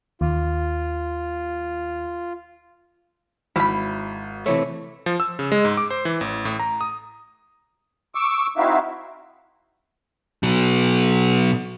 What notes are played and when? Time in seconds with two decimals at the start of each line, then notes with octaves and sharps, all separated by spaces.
0.21 D#2 F4
3.56 G#1 E4 F5 B5
4.46 C3 E3 A3 C#5
5.06 F3
5.20 E6
5.39 C#3
5.52 G#3
5.65 G#2
5.77 D6
5.91 C5
6.05 E3
6.21 A1
6.45 A2
6.60 A#5
6.81 D#6
8.15 C#6 D6 E6
8.57 C4 D#4 E4 F#4 E5 F5
10.43 B2 F#3